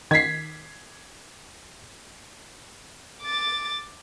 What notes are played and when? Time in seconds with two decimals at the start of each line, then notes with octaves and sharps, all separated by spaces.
0.11 D#3 G#6 B6 C7
3.22 D6 A6